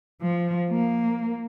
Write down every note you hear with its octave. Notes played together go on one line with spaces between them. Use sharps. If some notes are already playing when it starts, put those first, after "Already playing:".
F3
A#3